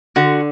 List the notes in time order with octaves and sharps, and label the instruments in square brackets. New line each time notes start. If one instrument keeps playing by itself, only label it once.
[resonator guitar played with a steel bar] D3 [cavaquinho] F#4